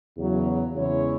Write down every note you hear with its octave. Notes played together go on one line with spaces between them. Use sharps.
E2 C#3 F#3
E2 C#3 G#3 E4 C#5